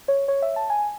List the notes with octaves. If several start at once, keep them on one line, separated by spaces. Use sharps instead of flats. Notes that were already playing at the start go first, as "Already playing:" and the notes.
C#5
C#5
E5
A5
G#5